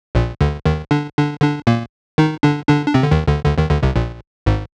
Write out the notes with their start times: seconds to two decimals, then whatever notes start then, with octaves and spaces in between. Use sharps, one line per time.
0.15 A#1 A#2
0.41 D2 D3
0.66 D#2 D#3
0.91 D3 D4
1.17 D3 D4
1.42 D3 D4
1.67 A#2 A#3
2.18 D#3 D#4
2.43 D3 D4
2.69 D3 D4
2.86 D4
2.94 C3 C4
3.03 D3
3.11 D#2 D#3
3.27 D2 D3
3.45 D2 D3
3.58 D#2 D#3
3.70 D2 D3
3.83 C2 C3
3.96 A#1 A#2
4.46 G#1 G#2